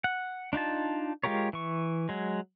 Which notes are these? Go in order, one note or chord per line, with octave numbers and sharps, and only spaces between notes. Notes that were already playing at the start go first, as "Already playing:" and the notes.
F#5
D4 D#4 F4 A5
G#3 F4 G4 A#4 C#5
E3 C#6
F#3 G#3